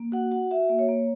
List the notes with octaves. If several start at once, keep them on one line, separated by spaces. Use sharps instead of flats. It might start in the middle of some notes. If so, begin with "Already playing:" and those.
Already playing: A#3
F#4 F#5
F#4 F#5
F#4 E5
A#3
C#5
A#3